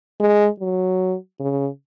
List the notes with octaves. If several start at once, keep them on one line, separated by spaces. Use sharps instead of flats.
G#3
F#3
C#3